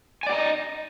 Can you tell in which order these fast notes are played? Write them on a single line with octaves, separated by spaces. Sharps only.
G#5 D5 G5 A#5 D#5